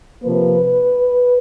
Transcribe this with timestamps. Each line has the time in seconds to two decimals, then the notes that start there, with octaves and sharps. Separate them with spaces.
0.24 C3 F3 A#3 B4